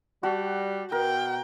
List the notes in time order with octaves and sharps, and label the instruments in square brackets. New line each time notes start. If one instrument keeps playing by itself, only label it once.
[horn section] G3 [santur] F#4 A5
[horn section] B2 [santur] A#4 [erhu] G5